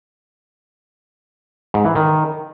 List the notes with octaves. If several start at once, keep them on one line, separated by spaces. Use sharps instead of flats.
G#2
E3
D#3